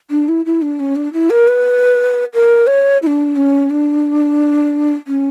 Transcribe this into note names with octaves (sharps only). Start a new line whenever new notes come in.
D4
E4
E4
D4
C#4
D4
E4
A#4
B4
A#4
C#5
E4
D4
C#4
D4
C#4